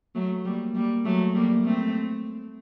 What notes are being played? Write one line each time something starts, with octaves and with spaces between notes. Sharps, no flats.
F#3 A3
G3 A#3
G3 A#3
F#3 A3
G3 A#3
A3 C4